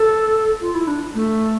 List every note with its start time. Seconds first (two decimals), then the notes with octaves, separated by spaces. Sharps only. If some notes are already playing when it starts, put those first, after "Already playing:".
Already playing: A4
0.61 F4
0.75 E4
0.87 D4
1.14 A3